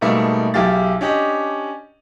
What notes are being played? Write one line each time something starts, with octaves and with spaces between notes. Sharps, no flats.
G#2 B2 G3 A3 A#3
B1 E4 G4 G#4 F5 A6
C#4 D4 G4 D#5